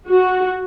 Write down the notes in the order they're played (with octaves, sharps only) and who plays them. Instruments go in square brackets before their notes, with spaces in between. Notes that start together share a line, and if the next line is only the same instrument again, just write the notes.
[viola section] F#4